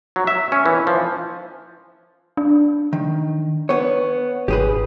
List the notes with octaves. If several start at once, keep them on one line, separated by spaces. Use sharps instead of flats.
F#3
E5
C#4
E3
F3
D4
D#3
B3 C#5
G#1 G4 G#4 B4